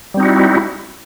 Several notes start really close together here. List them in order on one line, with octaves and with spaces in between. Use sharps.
G3 C4 D#4 F#4 E4